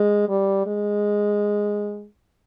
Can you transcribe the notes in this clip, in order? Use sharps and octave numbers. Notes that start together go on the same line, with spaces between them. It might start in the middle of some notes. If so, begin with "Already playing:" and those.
Already playing: G#3
G3
G#3